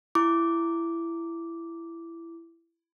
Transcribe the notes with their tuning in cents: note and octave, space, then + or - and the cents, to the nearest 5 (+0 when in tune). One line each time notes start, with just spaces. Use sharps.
E4 +20 D6 -10